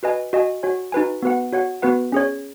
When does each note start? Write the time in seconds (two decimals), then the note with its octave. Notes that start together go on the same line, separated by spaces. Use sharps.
0.03 F#4 B4 D#5 G#5
0.33 F#4 D#5 G#5
0.63 F#4 C#5 G#5
0.92 D#4 F#4 B4 G#5
1.23 B3 F#4 B4 F#5
1.53 F#4 C#5 F#5
1.82 B3 F#4 B4 F#5
2.12 C#4 G#4 C#5